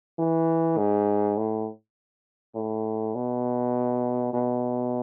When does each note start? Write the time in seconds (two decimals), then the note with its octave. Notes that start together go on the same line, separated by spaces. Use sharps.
0.18 E3
0.77 G#2
1.37 A2
2.55 A2
3.15 B2
4.33 B2